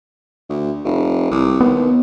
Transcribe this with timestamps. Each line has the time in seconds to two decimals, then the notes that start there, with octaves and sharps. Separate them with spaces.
0.50 D2
0.85 F1
1.31 C2
1.61 D#2 B3